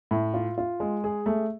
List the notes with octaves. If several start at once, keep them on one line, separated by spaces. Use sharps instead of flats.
A2
F4
F4
G#3
G#4
A3